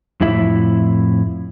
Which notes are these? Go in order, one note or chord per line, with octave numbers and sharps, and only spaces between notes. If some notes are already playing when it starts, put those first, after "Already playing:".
F2 A2 E4 E5